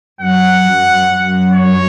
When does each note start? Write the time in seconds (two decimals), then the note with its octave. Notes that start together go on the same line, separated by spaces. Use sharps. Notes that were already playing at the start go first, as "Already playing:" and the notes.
0.21 F#2 F#5
0.65 F#2
1.09 F#2
1.53 C#5